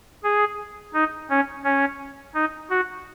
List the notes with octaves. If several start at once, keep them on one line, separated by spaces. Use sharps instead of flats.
G#4
D#4
C#4
C#4
D#4
F#4